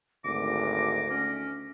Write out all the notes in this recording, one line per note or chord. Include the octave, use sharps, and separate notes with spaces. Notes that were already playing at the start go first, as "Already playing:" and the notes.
G#1 D2 D6 A#6
C#4